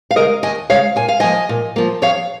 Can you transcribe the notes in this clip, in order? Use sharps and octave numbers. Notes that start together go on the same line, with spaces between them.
F5
C#3 G#3 A#4 D#5
D#2 D#5 G#5
C#3 G#3 C#5 F5
A#2 G#5
F5
F3 A#3 D#5 G#5
A#2
F3 A#3
F2 C#5 F5